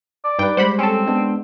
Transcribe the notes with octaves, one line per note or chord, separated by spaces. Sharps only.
D5
G2 D#4 B4 G5
G3 G#3 C5 F#5 B5
C4 C#4 A4
G#3 B3 D4